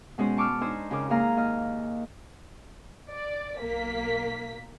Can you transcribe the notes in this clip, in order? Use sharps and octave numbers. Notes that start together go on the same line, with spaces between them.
B2 G#3 C#4 C5
A5 C#6 D6 E6 F6
D4 D#4 C5 G#5 E6
F2 C#3 G#4 A#4 D6
D#2 G#2 A#3 G#4 F5 A#5
D#2 D#5 F6
D5
B1 A#3 B6